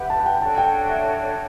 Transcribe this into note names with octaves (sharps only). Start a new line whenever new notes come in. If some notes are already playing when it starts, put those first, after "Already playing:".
Already playing: G4 B4 E5 F#5 B5
A5
F#5
G5
D4 F#4 A4 C#5 A5
G5
E5